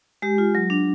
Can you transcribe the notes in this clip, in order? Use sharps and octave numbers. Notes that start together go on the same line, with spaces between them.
G#3 G4
F4
F#3
D4